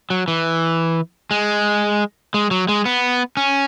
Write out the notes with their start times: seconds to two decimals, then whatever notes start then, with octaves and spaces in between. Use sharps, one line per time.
0.10 F#3
0.28 E3
1.31 G#3
2.34 G#3
2.51 F#3
2.68 G#3
2.86 B3
3.37 C#4